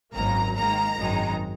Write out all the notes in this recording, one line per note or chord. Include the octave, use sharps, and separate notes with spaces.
G#1 F#2 D#3 F#3 A#3 A#5
G#2 D#3 A#3 A#5
G#1 F#2 D#3 G#3